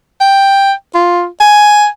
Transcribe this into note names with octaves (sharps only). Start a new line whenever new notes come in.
G5
F4
G#5